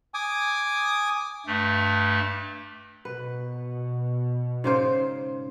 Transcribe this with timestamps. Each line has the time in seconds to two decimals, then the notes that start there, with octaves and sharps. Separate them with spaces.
0.14 G#5 D6 D#6
1.46 G2 A3
3.05 B2 B4
4.64 G#2 C#3 C5